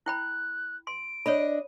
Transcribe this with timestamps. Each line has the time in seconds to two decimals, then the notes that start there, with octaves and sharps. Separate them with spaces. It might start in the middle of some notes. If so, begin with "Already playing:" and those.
0.06 E4 G5 B5 F#6
0.87 C6 D7
1.26 D4 C#5 D#5 B5